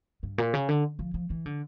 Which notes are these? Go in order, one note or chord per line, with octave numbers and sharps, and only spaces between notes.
G2
A#2
C#3
D3
F3
F3
E3
D3